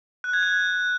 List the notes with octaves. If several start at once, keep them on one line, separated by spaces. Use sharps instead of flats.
F#6
G#6
F#6